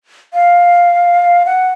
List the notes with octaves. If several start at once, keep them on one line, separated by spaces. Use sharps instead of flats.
F5
F#5